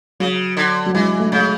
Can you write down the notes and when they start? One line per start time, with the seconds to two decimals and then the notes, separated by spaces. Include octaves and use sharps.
0.20 C#3 F#3
0.57 D3
0.86 F#3
0.94 E3 G#3
1.20 A3
1.32 C#3